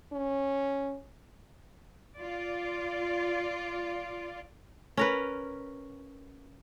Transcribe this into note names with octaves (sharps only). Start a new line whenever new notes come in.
C#4
F4 D5
C#4 A#4 B4